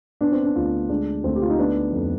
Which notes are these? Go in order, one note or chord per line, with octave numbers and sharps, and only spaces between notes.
B3 D4
C4
D4
D2 F4
G#3 D4
D2 C4
G4
F4
D#4
B3 D4
F2